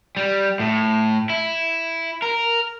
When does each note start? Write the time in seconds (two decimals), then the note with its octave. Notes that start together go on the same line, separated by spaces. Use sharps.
0.17 G3
0.60 A2
1.30 E4
2.22 A#4